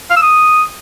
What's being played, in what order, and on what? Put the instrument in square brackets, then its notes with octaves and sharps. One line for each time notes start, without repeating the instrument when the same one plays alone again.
[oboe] F5
E6
D#6